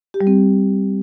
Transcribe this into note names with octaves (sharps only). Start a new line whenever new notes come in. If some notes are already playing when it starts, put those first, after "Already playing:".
G4
G3
C4